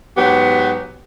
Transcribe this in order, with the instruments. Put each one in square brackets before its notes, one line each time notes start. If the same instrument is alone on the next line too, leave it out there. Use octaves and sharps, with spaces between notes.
[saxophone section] G#2 F#3 B3 G4